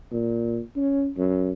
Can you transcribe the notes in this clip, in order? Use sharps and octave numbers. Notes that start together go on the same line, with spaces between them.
A#2
C#4
F#2